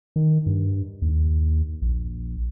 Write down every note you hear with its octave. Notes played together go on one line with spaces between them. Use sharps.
D#3
G2
D#2
A#1